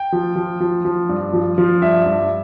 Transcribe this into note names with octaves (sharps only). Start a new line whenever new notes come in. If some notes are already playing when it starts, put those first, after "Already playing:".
Already playing: G5
F3
F3
F3
F3
G2
F3
F3
G2 E5
G2